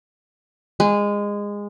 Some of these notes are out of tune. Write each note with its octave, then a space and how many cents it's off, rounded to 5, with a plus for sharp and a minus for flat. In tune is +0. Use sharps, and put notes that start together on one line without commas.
G#3 -20